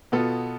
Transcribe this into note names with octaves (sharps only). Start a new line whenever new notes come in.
B2 B3 F4 A4